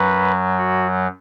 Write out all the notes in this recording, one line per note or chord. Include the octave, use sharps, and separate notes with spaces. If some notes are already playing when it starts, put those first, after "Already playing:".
Already playing: F#2 F#3 B4
F#4